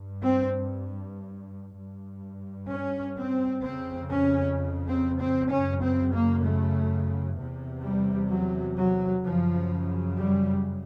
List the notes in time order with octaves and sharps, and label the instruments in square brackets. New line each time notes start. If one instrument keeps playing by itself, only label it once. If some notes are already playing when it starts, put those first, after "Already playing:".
Already playing: [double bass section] G2
C4
G2
C#4
C4
F2 C#3 C4
C#4
C4
C4
F#2 C#3 C#4
C4
A#3
A3
E2 C3
G3
F#3
F#3
F#2 C#3 F3
G3